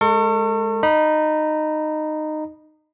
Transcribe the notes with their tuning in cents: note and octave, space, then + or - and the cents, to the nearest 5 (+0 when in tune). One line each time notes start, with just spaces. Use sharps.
G#3 +15 A4 +45 C#6 -20
D#4 -15 B5 -25